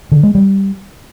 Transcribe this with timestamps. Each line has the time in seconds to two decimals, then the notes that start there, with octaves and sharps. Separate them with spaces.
0.12 D3
0.23 G#3
0.35 G3